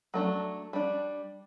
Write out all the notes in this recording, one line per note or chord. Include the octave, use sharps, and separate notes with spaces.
F#3 A3 D4
G3 D4